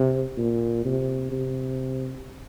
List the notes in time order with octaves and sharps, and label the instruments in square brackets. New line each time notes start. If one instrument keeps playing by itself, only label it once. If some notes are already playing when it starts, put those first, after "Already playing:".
Already playing: [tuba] C3
A#2
C3
C3